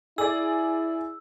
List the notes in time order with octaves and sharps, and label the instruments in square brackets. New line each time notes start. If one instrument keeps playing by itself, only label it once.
[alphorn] E4 [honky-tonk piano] G#4 D5 [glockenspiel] E6